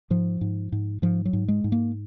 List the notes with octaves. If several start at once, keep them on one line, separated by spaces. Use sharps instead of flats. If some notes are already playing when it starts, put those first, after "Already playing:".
G#2 F3
G#2
G#2
G#2 F3
F#3
G#2
G#3
G#2
A#3